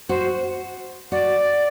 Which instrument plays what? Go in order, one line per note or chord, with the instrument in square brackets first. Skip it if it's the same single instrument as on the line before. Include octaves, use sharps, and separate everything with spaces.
[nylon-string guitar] F#4 [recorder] C5
[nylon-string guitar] F#4 [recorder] D5